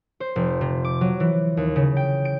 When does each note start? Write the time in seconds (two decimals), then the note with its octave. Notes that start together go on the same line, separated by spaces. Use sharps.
0.20 C5
0.36 F1
0.61 C3
0.84 D6
1.01 F#3
1.20 E3
1.57 D#2
1.76 C#3
1.97 G5
2.25 D7